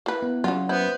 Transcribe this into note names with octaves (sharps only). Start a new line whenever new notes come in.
A#3 E4 B4 F#6
B3
C#3 F#3 C#4 F4 F#5
A#3 B3 E4 C5 G6